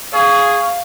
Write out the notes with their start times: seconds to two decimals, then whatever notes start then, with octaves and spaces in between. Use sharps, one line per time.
0.13 G#4 F5 C#6